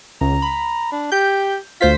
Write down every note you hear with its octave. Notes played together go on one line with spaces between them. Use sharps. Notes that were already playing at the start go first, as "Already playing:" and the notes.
C#2 A#5
B5
D4
G4 G6
D2 F4 C5 B6